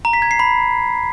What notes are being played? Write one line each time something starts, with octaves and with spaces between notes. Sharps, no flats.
A#5
B6
G#6
C7
B5